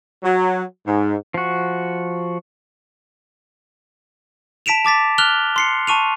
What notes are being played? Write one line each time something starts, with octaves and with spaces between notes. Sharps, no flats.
F#3
G#2
F3 F#4
A5 B6 D7 E7 F7
A5 D6 A6 B6
F6 F#6 F7 G7
C6 C7 C#7
A5 C#6 D#7 F7